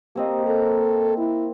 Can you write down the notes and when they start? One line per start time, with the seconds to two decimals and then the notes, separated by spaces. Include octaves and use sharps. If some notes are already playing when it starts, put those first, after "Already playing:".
0.15 A#3 C4 G4 D#5
0.47 A4 A#5
1.18 E4